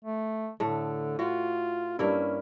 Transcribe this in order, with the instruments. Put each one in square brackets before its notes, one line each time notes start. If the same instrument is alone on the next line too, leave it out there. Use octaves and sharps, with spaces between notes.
[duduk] A3
[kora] A2 A3 [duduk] D3
[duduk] F4 [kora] F#4
[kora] G2 A#3 E4 [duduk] C#4